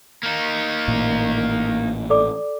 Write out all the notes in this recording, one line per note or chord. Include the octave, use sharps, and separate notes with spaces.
A#3 D#4
A1 A#2 E3
A4 D5 D6